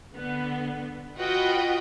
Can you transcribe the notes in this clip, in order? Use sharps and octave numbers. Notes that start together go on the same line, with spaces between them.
D3 B3
F4 F#4 B4 D#5 F#5 G5